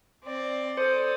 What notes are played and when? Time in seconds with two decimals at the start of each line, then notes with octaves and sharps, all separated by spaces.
0.24 C4 D5
0.77 A4 C5 D5 D#6